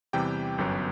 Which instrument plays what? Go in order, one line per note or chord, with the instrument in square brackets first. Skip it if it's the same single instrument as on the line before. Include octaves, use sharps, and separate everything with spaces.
[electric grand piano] E2 C3 E3 G3 G4 G5
G1 F#2 F#3 B3